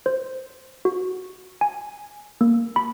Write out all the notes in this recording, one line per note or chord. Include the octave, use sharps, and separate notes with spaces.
C5
F#4
G#5
A#3
B5